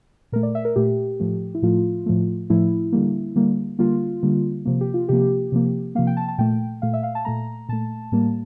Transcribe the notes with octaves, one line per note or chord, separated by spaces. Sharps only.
A#2 A3 A#4
D5
E5
A#4
A#2 A3 G4
A2 F3 A3
E4
A2 F3 A3 F4
A2 F3 A3
A2 F3 A3 E4
D3 G3 A#3
D3 G3 A#3
D3 G3 A#3 F4
D3 G3 A#3
C3 F3 A#3
G4
F4
C3 F3 A#3 G4
C3 F3 A#3
C3 F3 A#3 F5
G5
A5
A5
A#2 A3 G5
A#2 A3 F5
E5
F5
A5
A#2 A3 A#5
A#2 A3 A5
A2 G3 A#3